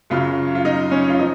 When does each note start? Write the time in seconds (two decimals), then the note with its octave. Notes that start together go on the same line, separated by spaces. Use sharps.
0.10 F#2 C#3 F#3 F4
0.55 F4
0.65 D#4
0.91 C#4
1.09 F4
1.19 F3 D#4